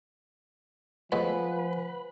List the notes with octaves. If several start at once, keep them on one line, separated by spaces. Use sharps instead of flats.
A2 F3 G#3 B3 B4 C5 F#5 G#5